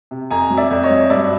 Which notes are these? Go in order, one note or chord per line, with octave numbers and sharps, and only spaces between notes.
C3
F2 G#5 A#5
F#3
D5 E5
F2
C#5 D#5
F#3
G2 D5 E5